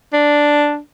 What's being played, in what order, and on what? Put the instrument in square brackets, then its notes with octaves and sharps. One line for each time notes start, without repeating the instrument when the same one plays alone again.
[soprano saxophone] D4